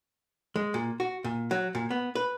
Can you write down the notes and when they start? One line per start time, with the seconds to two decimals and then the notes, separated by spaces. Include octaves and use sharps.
0.56 G#3
0.74 A#2
1.00 F#4
1.24 A#2
1.51 F#3
1.75 A#2
1.91 B3
2.15 B4